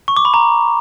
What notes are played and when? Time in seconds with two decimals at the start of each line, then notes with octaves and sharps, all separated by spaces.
0.08 C#6
0.17 D6
0.25 B5
0.34 A#5